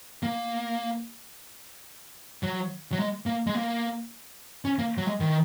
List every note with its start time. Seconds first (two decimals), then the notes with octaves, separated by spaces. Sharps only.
0.23 A#3
2.43 F#3
2.92 F#3
2.99 G#3
3.26 A#3
3.47 G#3
3.55 A#3
4.65 C#4
4.79 A#3
4.97 F#3
5.06 G#3
5.20 D#3